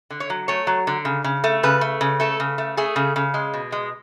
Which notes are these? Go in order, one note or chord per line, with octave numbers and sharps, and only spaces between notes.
D3
C#5
F#3
A3 C#5
F#3
D3
C#3
C#3
A3
C#3 B4
A3
C#3
A3 A4
C#3
A3
A3 G#4
C#3
C#3
G#3
B2
G#3